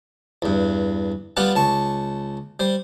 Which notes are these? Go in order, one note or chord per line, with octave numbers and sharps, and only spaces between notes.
E2 G2
G3 B3 F4 G4 F#5
C#2 A5 C#6
G3 C5